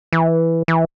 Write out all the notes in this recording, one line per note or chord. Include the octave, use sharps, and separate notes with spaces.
E3
E3